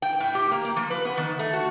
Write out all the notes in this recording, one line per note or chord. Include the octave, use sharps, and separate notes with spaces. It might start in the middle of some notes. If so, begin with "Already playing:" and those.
G5
A2
G4
A#3
A#3
F3
B4
B3
D#3
A3
F#4